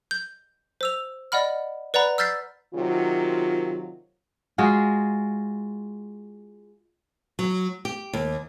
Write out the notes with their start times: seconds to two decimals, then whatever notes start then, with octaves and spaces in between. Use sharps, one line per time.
0.11 G6
0.81 C5 E6 F7
1.32 D5 D#5 F#5 B5 F6
1.94 B4 D5 F#5 A#5 B5
2.18 E6 F6 G6 A6 B6 C7
2.74 C3 D#3 F#3 F4
4.58 G#3 F4 F#4 G#4
7.39 F#3
7.85 G4
8.13 D#2